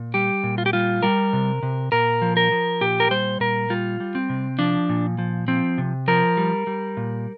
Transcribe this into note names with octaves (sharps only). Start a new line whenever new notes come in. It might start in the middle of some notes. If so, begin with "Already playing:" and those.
Already playing: A#2
G3 G4
A#2
F4
G4
G3 F4
G3 A#4
C3
C3
A#2 A#4
F3
A#4
F3
A#2 G4
A#4
G3 C5
A#2 A#4
G3 F4
G3
C4
C3
F3 D4
A#2
F3
F3 C4
C3
F3 A#4
G3
G3
A#2